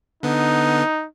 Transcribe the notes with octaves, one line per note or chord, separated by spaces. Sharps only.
D3 B3 D#4